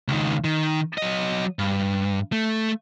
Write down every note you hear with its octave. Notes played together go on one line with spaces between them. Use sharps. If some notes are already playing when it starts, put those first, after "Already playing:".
C#2 D#3
D#3
F#3 D#5
G2
A3